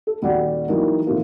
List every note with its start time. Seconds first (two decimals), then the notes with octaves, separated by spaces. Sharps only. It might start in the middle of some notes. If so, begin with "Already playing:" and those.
0.07 A4
0.22 D#1 G3 F#4 D5 F#5
0.68 E3 F#3 G3 A#3 D#4
1.07 A2 D#3 F3 A#3